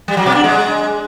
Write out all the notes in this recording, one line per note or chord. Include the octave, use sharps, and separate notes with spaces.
G3
F#3
B2
D4
G#3